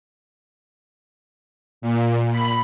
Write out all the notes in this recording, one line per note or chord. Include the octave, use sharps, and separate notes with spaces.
A#2
B5